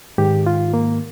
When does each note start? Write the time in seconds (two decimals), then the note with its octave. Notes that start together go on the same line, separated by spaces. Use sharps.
0.18 G#2 D#3 G4
0.46 F4
0.74 A#3